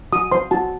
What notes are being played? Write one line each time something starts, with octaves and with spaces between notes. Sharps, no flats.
F#4 D#6
C5 C6
F#4 A5